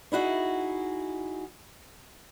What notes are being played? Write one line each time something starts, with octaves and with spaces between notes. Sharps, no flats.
D#4 E4 F#4 G#4